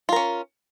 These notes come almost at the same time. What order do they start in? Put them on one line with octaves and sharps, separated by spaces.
F4 A#4 C#4